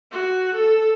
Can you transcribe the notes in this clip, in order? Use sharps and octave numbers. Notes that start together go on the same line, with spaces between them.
F#4
A4